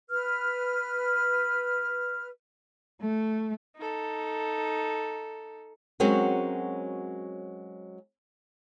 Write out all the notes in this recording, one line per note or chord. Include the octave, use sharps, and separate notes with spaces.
B4 F6
A3
D#4 A4
F#3 G#3 C4 C#4 F#4 A#4